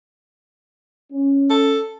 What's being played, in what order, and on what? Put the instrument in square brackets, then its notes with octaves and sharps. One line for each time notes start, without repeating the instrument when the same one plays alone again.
[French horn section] C#4
[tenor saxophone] A4